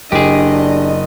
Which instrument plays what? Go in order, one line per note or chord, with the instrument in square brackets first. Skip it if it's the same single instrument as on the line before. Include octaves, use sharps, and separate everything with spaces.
[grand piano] F#1 [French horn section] D4 [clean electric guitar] G4 G#4 [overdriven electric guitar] D#5